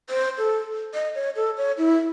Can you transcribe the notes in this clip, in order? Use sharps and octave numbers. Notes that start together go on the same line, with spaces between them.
C5
A4
D#5
C#5
A4
C#5
E4